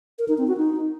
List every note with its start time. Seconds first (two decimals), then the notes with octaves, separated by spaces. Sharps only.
0.19 A#4
0.28 D#4
0.38 C4
0.48 F#4
0.57 D#4